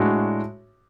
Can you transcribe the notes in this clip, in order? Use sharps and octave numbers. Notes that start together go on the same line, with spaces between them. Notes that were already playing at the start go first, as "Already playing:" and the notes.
Already playing: A2 G#3 D4 F#4